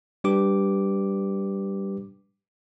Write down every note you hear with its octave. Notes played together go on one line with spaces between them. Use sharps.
G3 D4 G4 B4 D6